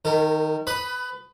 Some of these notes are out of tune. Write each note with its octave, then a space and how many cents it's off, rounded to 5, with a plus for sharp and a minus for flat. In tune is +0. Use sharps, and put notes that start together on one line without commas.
D#3 +0 A#4 -35
B4 +20 B5 +0 D#6 +0